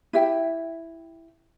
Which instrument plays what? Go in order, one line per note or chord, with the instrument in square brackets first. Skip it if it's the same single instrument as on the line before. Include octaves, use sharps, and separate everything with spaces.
[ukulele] E4 G4 E5 G5